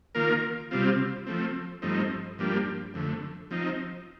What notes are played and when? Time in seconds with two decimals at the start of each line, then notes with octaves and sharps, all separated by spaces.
0.15 D#3 A#3 F4 A#4
0.71 C3 G3 C4 F4
1.26 F3 A3 C4
1.82 G2 F3 A3 C4 D#4
2.39 G2 F3 A#3 D4 G4
2.94 F2 D3 A3
3.51 F3 C4 D#4